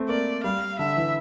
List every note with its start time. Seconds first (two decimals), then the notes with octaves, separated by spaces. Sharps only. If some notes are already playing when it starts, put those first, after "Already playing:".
Already playing: A3 C4
0.09 A#3 D5
0.44 G3 F5
0.79 D3 E5
0.97 E3